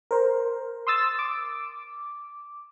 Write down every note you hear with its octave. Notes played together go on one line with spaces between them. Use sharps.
A#4 C5
C6 D#6 E6 A6
D6